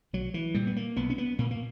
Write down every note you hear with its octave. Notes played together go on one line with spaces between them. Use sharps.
B1 F#3
E3
A#2 G3
B3
A#3
B1 B3
C#4
B3
A#2 A#3
A#3